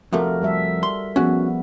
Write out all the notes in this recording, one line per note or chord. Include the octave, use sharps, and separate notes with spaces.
F2 C3 A3 F#4 A#4
G3 A4 E5
C6
F3 B3 C#4 F#4 G#4